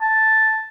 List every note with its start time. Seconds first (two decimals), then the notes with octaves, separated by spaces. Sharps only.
0.01 A5